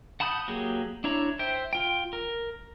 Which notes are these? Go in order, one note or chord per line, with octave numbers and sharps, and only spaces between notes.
F#5 A5 B5 D#6 G6
F#3 A#3 G4 G#4
D4 E4 C#5 A#5
C5 E5 G5
F4 G5
A#4